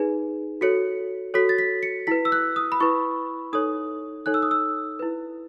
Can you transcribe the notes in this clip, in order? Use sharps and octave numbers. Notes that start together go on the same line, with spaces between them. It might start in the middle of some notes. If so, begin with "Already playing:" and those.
Already playing: D#4 G#4 B4
F#4 A4 C#5 C#7
F#4 A4 C#5 B6
A6
B6
C#7
E4 B4 B6
E6
F#6
D#6
B5
E4 B4 C#6
D#4 A4 C#5 D#6
D#4 A4 C#5 F#6
E6
D#6
E6
E4 B4